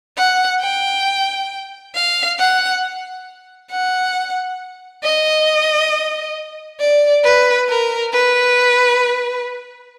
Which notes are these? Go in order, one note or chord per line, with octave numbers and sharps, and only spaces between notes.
F#5
G5
F5
F#5
F#5
D#5
D5
B4
A#4
B4